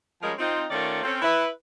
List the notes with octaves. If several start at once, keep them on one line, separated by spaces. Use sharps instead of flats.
F3 G3 G#3 C#4 A#4
C4 D#4 F4
D#3 A3 C#4 F4 A#4 D5
C4 C#4 A4
E4 B4